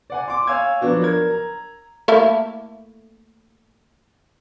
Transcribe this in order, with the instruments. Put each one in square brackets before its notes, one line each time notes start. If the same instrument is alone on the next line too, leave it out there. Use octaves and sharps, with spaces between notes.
[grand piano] D5 F#5 G#5
C6 D6
C#5 F5 G#5 E6 G#6
F3 F#3 B3 D4 F#4
A#4 G#6
A#5
[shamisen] A3 A#3 E4